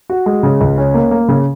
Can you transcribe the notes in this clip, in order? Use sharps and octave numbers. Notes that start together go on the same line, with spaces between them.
F#4
G#3
C#3
C#2
C#4
A#3
A#3
C#3